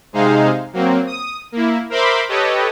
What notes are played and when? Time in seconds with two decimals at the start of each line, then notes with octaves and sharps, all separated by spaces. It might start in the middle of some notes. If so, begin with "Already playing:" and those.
0.13 C3 G#3 D#4 G#4 C5 F5
0.73 F#3 A#3 C4
1.07 D#6
1.52 A#3 E4
1.90 A#4 C5 E5 B5 C6 D6
2.29 G4 A4 B4 C#5 D#5